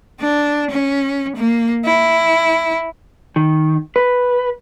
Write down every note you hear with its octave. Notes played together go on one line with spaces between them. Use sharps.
D4
C#4
A#3
E4
D#3
B4